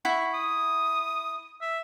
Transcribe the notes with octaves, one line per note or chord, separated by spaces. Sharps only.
E4 F#5 C#6
D#6
E5